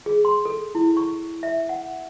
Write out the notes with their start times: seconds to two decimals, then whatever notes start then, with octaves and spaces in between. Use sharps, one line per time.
0.06 G#4
0.25 C6
0.45 A4
0.75 E4
0.97 C#6
1.43 E5
1.69 F#5